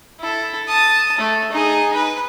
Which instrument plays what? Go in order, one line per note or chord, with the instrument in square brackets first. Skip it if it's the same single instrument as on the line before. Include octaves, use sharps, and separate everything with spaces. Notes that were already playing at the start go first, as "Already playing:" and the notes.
[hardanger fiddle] E4 A4
A5 D#6
A3
D#4 G#4
B4